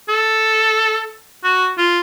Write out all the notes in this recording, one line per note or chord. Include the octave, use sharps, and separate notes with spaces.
A4
F#4
F4